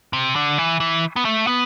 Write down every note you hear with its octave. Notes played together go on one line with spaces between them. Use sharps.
C3
D3
E3
E3
B3
A3
B3